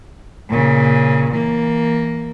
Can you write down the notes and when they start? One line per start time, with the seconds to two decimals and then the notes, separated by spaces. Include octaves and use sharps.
0.50 A#2 C#3
1.32 E3 A#3